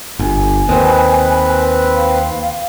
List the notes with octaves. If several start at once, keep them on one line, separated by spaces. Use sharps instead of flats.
G1 G#5
D#2 C4 B4
F5